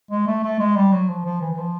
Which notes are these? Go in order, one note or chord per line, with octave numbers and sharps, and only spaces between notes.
G#3
A3
A3
G#3
G3
F#3
F3
F3
E3
E3
F3